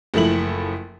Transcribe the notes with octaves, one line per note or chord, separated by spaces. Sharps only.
F#1 F3 A3 E4 F#7